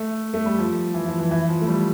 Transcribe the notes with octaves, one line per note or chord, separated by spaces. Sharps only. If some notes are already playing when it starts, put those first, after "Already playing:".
Already playing: A3
A3
G3
F3
E3
F3
E3
E3
F3
A3
G3